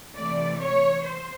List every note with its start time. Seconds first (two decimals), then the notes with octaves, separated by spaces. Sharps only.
0.15 C3 E3 A3 D5
0.59 C#5
1.04 C5